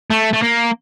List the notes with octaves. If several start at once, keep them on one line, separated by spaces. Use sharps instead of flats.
A3
A3
A#3